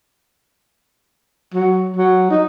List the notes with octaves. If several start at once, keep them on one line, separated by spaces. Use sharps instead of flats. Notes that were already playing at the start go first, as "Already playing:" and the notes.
F#3
F#3
D#4